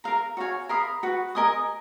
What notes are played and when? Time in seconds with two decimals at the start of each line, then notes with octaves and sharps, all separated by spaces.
0.04 A#4 F5 A#5
0.37 F#4 C#5 F5 G#5
0.69 A#4 F5 B5 D#6
1.03 F#4 B4 F#5
1.35 A#4 D#5 G#5 D#6